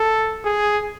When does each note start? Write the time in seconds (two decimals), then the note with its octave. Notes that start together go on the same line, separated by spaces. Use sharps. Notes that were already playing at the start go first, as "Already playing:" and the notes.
Already playing: A4
0.44 G#4